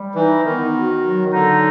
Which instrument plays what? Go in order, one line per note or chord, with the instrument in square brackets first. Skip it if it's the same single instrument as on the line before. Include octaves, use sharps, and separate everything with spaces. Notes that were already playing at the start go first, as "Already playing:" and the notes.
Already playing: [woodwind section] G3
[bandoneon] E3 [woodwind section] D#4
[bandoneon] D#3 [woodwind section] B3
[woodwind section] F#4
F#3
[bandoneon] D3 [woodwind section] D#4